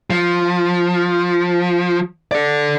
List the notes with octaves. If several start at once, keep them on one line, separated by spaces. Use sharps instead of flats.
F3
A4 D5